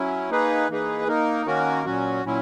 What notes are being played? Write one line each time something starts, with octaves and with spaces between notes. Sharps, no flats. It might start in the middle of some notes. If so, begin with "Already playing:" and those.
Already playing: F#3 C#4 E4
A#3 D#4 G#4 B4
E3 A#3 D#4 G#4 B4
A#3 D#4 A#4
D#3 A#3 C#4 F#4 A#4
A#2 F#3 C#4 F#4
A#2 F#3 C#4 E4